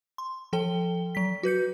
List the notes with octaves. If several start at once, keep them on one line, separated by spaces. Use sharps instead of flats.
C6
F3 A4 G5 G7
F#3 B6
F#4 B4 G6 C#7